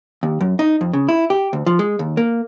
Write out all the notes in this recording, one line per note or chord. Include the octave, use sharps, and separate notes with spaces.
D#2
F#2
D#4
F2
C#3
E4
G4
D2
F3
G#3
D#2
A#3